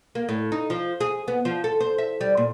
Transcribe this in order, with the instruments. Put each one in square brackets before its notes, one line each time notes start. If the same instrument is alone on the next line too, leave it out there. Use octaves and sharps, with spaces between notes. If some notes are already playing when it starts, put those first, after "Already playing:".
[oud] A#3
A2
D#4
F3
G#4
B3
F3
A4
C5
E5
G3
A#2